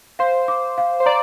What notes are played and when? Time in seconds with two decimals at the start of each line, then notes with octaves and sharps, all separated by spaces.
0.19 C5 F5
0.48 D6
0.78 F5
1.00 C5
1.06 D5 A#5